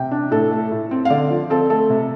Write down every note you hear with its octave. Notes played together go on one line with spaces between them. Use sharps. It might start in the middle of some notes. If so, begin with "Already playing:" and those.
Already playing: C3 G5
D4
A2 A4
A3
A2
C4
F5
D3 D5
F3
C4 A4
A3 A4
C3